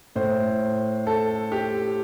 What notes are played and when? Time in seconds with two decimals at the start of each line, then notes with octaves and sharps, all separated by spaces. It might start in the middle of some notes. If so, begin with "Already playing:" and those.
0.16 A2 C5
1.07 A4
1.52 G4